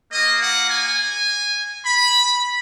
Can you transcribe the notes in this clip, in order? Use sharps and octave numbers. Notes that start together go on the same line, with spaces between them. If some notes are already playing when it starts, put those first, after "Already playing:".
A#3 F4 D#5
F#5
G#5
B5